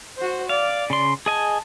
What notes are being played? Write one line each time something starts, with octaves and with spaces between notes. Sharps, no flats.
F#4 C5
D5 F5
C#3 C6
G#4 D#5 G#5 A5